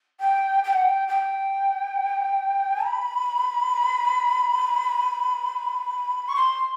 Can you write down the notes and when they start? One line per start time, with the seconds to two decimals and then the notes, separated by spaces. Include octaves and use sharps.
0.20 G5
0.63 G5
0.73 F#5
0.83 G5
1.08 G5
2.84 B5
6.28 C#6
6.35 C6